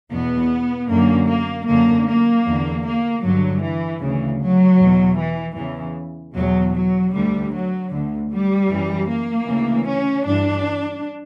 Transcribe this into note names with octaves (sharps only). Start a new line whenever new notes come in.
E2 B2 B3
F#2 D3 A#3
A#3
F#2 D3 A#3
A#3
E2 D3
A#3
G2 D3 F#3
E3
D2 C#3 E3
F#3
E2 B2
E3
E2 C#3 E3
E2 B2 F#3
F#3
D2 D3 G3
F#3
D2 D3
G3
F#2 E3
A#3
D2 C#3 E3
C#4
G2 E3 D4